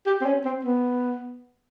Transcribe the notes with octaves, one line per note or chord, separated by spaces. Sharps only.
G4
C4
C#4
C4
B3